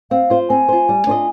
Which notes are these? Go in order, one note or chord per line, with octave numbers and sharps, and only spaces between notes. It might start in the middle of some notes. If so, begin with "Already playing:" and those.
C4 F5
F4 C5
C4 G#5
F4 C5
G3
D4 F4 C5 D#5